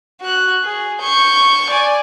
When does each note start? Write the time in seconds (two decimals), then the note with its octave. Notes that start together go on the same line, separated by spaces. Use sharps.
0.21 F#4 F#6
0.64 G#4
1.01 C#6 G6
1.70 D5 G#5